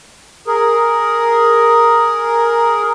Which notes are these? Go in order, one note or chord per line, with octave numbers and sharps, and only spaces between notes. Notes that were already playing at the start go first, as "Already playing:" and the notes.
G#4 A#4